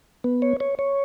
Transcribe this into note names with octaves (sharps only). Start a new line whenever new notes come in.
B3
C#5
C#5
C#5